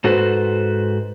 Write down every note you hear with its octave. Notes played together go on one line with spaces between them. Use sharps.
G#2 F#4 A4 B4 C5